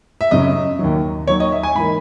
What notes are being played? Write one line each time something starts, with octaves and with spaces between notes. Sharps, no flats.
E5
F#2 C#3 F#3 C#4 D#5
D#2 D#3 F#3
D#2 D#3 F#3 C#5
D#5
E5
G#5
G#2 E3 A#3 B5